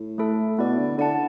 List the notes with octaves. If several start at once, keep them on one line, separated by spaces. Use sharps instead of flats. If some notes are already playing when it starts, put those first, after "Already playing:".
Already playing: A2
A3 E4 A4
B2 B3 E4 D5
D3
D3 E4 D5 F#5 A5